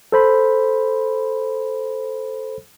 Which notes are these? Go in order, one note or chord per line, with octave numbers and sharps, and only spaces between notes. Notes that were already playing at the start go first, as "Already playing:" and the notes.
A4 C5 B5